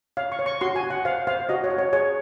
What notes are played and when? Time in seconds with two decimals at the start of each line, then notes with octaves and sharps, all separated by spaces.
0.17 C#5 F5
0.32 C#6
0.39 C#5
0.46 C#6
0.61 F#4 C6
0.76 G#5
0.83 F#4
0.90 F#5
1.05 C5 F5
1.27 C5 F5
1.49 F#4 D#5
1.64 C#5
1.70 F#4
1.78 C#5
1.93 G#4 C#5